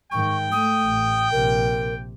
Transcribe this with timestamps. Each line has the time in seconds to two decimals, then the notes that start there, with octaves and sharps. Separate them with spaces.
0.12 G#2 D#3 G5 C#6
0.52 A3 D#6
0.83 A1
1.32 A#1 C3 A#4